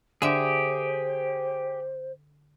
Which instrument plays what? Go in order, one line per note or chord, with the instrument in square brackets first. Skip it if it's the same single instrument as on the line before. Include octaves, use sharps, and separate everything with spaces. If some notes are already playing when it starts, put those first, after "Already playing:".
[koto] D3 E5 [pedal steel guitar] G4 G#4 [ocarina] C5